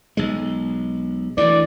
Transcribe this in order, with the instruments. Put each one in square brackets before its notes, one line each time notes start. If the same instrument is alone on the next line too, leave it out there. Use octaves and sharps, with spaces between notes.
[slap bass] B1 G#3
[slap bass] D2 E3 [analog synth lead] D5